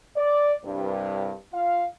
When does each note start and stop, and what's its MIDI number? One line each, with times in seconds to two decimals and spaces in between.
0.16 0.53 74
0.65 1.33 36
0.65 1.33 43
1.53 1.84 65
1.53 1.84 77